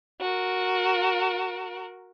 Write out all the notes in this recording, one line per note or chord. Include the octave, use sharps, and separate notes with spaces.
F#4 A#4